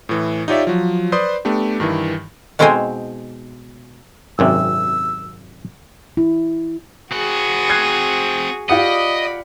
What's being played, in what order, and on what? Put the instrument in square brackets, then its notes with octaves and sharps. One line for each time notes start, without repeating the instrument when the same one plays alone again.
[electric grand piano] A2 E3
D#4 F4 G4 C#5 D5 E5
F3 F#3
B4 C5 D5 C6 D#6
A3 B3 D4 G4
G2 D#3 E3
[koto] B2 G#3 C4 D#4 C5 G#5
[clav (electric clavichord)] G#1 F#2 C3 [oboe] E6
[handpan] E4
[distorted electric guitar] C4 F#5 [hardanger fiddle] F#4 G#4
[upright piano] F#6 G#6 C7
[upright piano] F4 G4 F#5 [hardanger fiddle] D5 B5 [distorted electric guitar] D#5